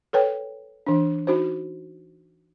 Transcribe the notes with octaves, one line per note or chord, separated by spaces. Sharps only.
A4 B4 C#5 G5
E3 D4
D#4 F#4 C5